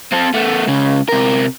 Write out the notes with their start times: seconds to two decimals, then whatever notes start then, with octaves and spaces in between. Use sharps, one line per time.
0.12 C4 A4
0.34 A3 B3
0.68 C#2 C#3
1.09 C3 A#4